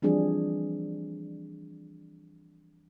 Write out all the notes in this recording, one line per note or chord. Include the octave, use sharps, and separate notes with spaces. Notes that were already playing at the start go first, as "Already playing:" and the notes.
E3 F3 G3 C4 D4 G#4